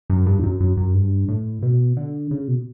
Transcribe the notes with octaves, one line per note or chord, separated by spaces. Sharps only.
F#2
G2
E2
F#2
F#2
F#2
G2
A2
B2
D3
C#3
B2